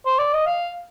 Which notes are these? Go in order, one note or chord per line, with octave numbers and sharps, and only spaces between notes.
C5
D5
D#5
F5